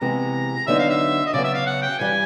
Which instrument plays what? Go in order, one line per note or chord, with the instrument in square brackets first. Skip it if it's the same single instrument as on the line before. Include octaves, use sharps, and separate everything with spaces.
[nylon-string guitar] C3 E3 G#3 B3 E4 [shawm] A#5
[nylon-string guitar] D3 F#3 B3 D#4 [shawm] E5
[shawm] F5
E5
D#5
[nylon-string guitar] C#3 F#3 B3 [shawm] D5
[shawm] E5
F5
F#5
G5
[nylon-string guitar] G2 E3 G3 [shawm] G#5